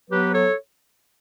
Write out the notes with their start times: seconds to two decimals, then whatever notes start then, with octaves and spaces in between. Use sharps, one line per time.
0.09 F#3 B3 G4 B4
0.33 A4 C#5